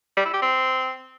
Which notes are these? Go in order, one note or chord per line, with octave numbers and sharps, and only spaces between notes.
G3
E4
G4
C4